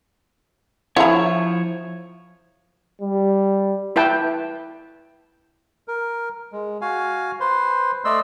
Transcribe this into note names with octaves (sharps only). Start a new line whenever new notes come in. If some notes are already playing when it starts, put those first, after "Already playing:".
F3 E4 C#5 A#5
G3
E4 B4 G5 A5
A#4
G#3
F#4 F5 G#5
B4 C5 C6
A3 D5 D#5 C6 E6